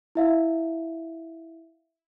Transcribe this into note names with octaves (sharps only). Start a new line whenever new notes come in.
E4 E5 F5